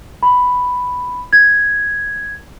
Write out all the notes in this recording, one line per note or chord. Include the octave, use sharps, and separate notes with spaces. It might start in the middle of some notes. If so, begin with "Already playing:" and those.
B5
G#6